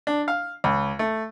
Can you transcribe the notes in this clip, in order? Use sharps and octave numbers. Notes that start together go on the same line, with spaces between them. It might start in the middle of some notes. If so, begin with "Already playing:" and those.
D4
F5
C#2
A3